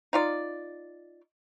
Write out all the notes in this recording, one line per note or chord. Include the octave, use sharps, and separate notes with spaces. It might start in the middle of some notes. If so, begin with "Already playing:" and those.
D#4 F4 D5